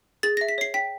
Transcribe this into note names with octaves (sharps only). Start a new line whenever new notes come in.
G#4 A6
A#6
E5
B6
C#5 C7
G5 B6